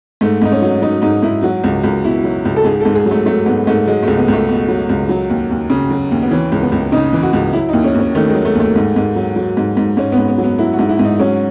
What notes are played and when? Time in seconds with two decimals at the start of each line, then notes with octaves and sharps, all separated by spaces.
0.21 G#2 A3
0.42 G#2 D#4
0.52 C#4
0.62 F#3
0.82 F#3 D#4
1.02 G#2 D#4
1.23 G#2 E4
1.43 F#3 F#4
1.64 C#2
1.83 C#2
2.04 B2 E4
2.24 F#3
2.45 C#2
2.56 A4
2.65 G#2 G#4
2.81 G#2 A4
2.95 G#4
3.06 F#3
3.11 A3
3.26 F#3 A3
3.46 G#2 B3
3.67 G#2 A3
3.87 F#3 G#3
4.03 C#2 A3
4.18 B3
4.28 C#2
4.33 A3
4.48 B2
4.68 F#3
4.89 C#2
5.09 F#3
5.30 D#2
5.51 D#2
5.70 C#3
5.90 F#3
6.11 D#2
6.22 B3
6.31 E3 C#4
6.52 C#2
6.62 B3
6.72 C#2
6.92 C#3 D#4
7.13 E3
7.23 F#4
7.33 C#2
7.53 F#3 E4
7.69 D#2 D#4
7.84 C#4
7.94 D#2 C#4
8.15 D#3 A3
8.30 G#3
8.35 F#3
8.45 A3
8.55 D#2 A3
8.76 G#2
8.96 G#2
9.16 F#3
9.36 F#3
9.57 G#2
9.77 G#2
9.97 G#2 C#4
10.12 B3
10.18 G#2
10.28 B3
10.38 F#3
10.44 B3
10.59 F#3 E4
10.74 F#4
10.79 G#2
10.89 E4
10.99 G#2
11.04 D#4
11.19 F#3 C#4